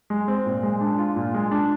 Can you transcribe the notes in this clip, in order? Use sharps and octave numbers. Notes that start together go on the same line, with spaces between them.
G#3
C4
A#2
G#3
D4
F4
A#2
G#3
D4